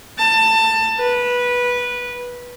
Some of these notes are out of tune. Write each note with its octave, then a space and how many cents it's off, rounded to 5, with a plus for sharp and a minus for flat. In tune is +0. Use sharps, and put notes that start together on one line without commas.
A5 +20
B4 -15